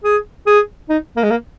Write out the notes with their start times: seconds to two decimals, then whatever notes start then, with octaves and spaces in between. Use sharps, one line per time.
0.04 G#4
0.46 G#4
0.89 D#4
1.16 A#3
1.23 G#3
1.31 A#3